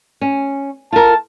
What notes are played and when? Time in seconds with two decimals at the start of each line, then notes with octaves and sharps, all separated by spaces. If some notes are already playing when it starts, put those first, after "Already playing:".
0.21 C#4
0.93 F4 A#4 A5